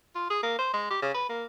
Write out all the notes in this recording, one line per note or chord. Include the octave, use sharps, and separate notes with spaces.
F4
G#4
A#3
C5
G#3
G4
C#3
B4
A#3